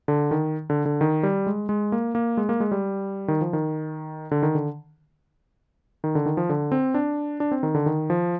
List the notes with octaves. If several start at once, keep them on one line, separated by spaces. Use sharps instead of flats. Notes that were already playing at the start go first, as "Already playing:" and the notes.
D3
D#3
D3
D3
D#3
G3
G#3
G#3
A#3
A#3
G#3
A#3
G#3
G3
D#3
F3
D#3
D3
D#3
D3
D#3
D3
D#3
F3
D3
C4
D4
D4
C4
D#3
D3
D#3
F3